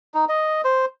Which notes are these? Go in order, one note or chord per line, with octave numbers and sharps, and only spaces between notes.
D#4
D#5
C5